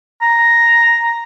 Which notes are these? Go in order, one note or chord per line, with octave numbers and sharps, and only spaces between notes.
A#5